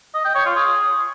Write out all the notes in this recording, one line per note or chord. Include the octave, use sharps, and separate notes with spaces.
D#5
G5
C#5
F4
G#4